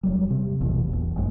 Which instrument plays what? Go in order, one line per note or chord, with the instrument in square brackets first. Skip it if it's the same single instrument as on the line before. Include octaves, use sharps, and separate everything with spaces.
[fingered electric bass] E1 F#3 G3
C3
A1 E2 B2
E1 A#1
G#1 F#2 G#3